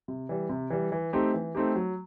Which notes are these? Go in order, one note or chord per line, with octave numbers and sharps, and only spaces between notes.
C3
E3 G3
C3
E3 G3
E3
A3 C4 D#4 G4
E3
A3 C4 D#4 G4
F#3